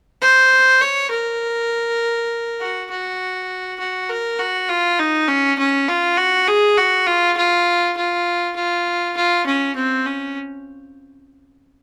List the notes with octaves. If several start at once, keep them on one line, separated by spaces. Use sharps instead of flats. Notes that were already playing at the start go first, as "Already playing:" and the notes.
C5
C#5
A#4
F#4
F#4
F#4
A#4
F#4
F4
D#4
C#4
C#4
F4
F#4
G#4
F#4
F4
F4
F4
F4
F4
C#4
C4
C#4